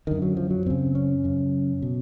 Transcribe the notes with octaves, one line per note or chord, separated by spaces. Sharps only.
F#2 D3 D#3
F#3
F3
F#3
F#2 C#3 C4
C#4
F#2 C#3
B2